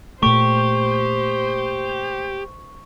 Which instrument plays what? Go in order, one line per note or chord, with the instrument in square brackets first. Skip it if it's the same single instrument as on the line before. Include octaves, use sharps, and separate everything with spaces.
[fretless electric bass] A#2 A3 [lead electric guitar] G4 [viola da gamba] C5 [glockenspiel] C#6